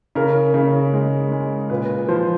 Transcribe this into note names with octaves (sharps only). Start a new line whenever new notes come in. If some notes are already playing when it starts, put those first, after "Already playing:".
C#3 A#4
C#3
G#3
G#3
A#2 B4
F3 C5